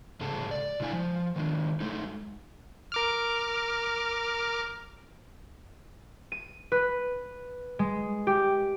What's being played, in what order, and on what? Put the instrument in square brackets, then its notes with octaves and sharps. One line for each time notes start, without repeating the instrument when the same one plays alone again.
[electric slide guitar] G#2 C#3 G#4 A4
D5
B2 D3 G#3 E4 F5 G#5
F3
D#3 G#3 D4
F#3 G#3 A3 D#4
[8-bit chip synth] A#4 D6 F6
[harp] D#7
B4
G#3
G4